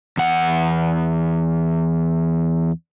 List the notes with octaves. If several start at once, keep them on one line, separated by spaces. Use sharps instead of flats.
E2 F#5